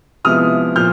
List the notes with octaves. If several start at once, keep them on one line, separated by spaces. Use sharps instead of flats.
C3 F3 G#3 B3 E4 D#6 F6
A#2 F3 F6 G6